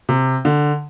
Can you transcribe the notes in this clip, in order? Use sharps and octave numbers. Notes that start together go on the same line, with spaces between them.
C3
D3